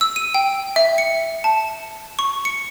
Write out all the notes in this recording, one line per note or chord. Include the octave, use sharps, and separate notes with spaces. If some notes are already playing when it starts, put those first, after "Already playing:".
E6
D#7
G5
E5
C#7
A5
C#6
C#7